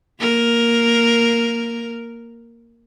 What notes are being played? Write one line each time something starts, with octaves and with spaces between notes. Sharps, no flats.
A#3 A#4